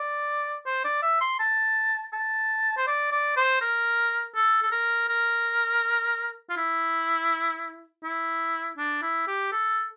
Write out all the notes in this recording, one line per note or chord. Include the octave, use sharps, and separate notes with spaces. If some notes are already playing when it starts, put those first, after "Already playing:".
Already playing: D5
C5
D5
E5
C6
A5
A5
C5
D5
D5
C5
A#4
A4
A4
A#4
A#4
F4
E4
E4
D4
E4
G4
A4